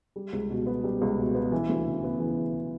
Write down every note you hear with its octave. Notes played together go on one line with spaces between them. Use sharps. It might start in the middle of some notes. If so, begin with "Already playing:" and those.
G3
C#2
B2
B3
G3
C#2
B2
B3
E3
D2
C#3
B3
E3